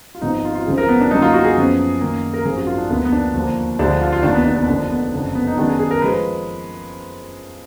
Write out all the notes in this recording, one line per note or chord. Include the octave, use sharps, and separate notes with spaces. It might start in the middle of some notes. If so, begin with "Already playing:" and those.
F4
G#1 G#2 F3 B3 D#4
D#4
F4
F4
G#1 F#2 F3 G#3 G#4
A#4
B3
D4
F#2 D3 F#3 A#3 D#4
F4
F#4
G#4
F#2 F3 B3
F#2 D#3 A#3
A#4
G#1 F#2 F3 G#4
F#4
F4
D4
D2 D3 F3 A#3 B3
B3
D4
D#2 D3 F3 A#3
D2 D3 F3 G#3 D4
F4
F4
F1 D#2 D#3 D4
B3
D4
B3
F1 F2 D3 F3 A#3 D4
B3
F#1 F2 D3 D4
B3
D#4
F#2 D#3 G#3 B3 D4
G#4
G#4
A#4
F3 G#3 B4